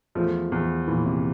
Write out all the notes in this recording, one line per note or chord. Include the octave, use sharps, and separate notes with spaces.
E2 F3 A3
E2
A#2 E3
C3